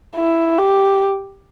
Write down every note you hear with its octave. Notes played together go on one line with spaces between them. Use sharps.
E4
G4